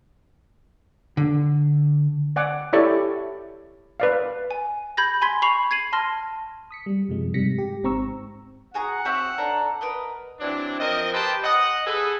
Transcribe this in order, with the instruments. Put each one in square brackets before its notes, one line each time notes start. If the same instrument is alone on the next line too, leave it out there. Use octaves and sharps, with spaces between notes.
[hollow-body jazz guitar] D3
[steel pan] D5 F#5 G#5 D6
E4 G4 A4 C#5 D5 E5
B4 D5 F5
[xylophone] G#5
B5 G6 G#6 A#6
G#5 B5 C6 G#6 B6
B5 C#6 C7 F7
G#6 C7 D#7 F#7
A5 C6 F6 A#6
[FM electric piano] D#6 B6 C#7
G3
F#2 C3 F3 G#3
G#2 C3 G3 A#6 B6 C#7
G4
G#1 G#2 C4 A#5 C#6 E6
[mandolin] F#4 G#4 A#5 [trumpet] F#5
[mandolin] C4 F#4 E5
D4 A4 A#5
A#4 B4 D#5
[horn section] E3 F#3 C4 D4
F3 C4 A#4 D#5
G4 B4 C5 D#5 G5 A5
D#5 F#5
G#4 A4 B4